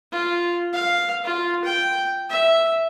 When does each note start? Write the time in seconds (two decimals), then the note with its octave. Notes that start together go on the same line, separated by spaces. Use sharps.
0.12 F4
0.73 F5
1.24 F4
1.65 G5
2.30 E5